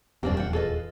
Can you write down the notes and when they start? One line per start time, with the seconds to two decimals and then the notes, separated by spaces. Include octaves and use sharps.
0.23 D#1 E2 G2 C#3 A#3 C4 D4 G4
0.37 F3 F#5 G5
0.53 F4 G#4 A4 B4 D#5